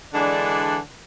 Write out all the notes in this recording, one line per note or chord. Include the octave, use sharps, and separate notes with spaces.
D3 E3 G#3 D4